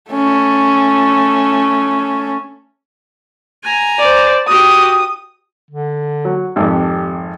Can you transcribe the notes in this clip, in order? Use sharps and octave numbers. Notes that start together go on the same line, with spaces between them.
A3 C#4
G#5 A#5
C5 D5
F#4 G4 D#6
D3
F#3
G#1 F2 G4